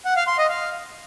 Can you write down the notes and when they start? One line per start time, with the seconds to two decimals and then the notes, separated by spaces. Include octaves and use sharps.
0.05 F#5
0.16 F5
0.27 C6
0.38 D#5
0.49 F5